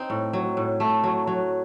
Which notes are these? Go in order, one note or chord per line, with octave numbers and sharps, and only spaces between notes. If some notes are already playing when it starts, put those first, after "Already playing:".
Already playing: C4 D#4
A2
F#3
A2
A3
F#3
F#3